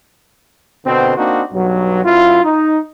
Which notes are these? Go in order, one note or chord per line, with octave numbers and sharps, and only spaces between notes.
B2 D3 C4
A#3 C4 D4 D#4 F#4
B1 G2 F#3
F#2 E4 F4
D#4